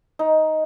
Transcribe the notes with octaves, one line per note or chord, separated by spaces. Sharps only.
D#4